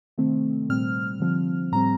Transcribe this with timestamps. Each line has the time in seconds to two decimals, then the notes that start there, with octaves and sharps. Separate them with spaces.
0.18 C3 D#3 A3 C4
0.69 A#2 G3 C4 F6
1.20 D3 F3 C4
1.72 A2 G3 C4 A#5